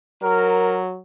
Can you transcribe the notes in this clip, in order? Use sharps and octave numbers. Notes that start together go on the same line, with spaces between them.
F#3 A#4